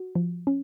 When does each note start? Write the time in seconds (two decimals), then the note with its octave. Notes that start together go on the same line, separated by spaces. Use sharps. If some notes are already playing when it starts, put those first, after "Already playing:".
Already playing: F#4
0.15 F3
0.47 C#4